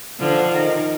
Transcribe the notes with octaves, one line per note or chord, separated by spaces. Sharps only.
D3 F3
D#3